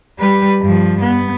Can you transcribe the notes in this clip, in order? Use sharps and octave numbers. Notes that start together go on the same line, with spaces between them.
G3 B4
G2 F3
B3